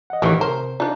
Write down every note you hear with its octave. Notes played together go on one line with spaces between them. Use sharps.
D#5 F#5
A1 D#3 E3 G4 C#5
C3 A#4 C5
D4 D#4 F4 D5